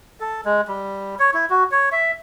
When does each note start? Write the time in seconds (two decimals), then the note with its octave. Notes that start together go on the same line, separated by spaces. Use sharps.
0.20 A4
0.45 G#3
0.68 G3
1.19 C#5
1.34 E4
1.50 F#4
1.71 C#5
1.92 E5